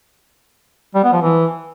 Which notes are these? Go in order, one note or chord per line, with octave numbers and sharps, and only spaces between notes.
G3
B3
F3
E3